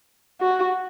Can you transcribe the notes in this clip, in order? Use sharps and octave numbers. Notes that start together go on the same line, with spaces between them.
F#4